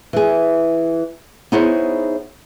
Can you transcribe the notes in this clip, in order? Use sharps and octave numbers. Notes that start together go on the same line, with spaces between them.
E3 G#4
B3 D#4 E4 G#4 C5 C#5